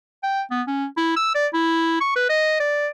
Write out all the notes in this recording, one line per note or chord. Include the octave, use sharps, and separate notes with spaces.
G5
B3
C#4
E4
E6
D5
E4
C#6
B4
D#5
D5